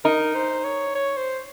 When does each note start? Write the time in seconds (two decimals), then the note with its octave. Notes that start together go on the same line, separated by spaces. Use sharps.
0.05 D#4 A#4
0.35 C5
0.64 C#5
0.95 C#5
1.17 C5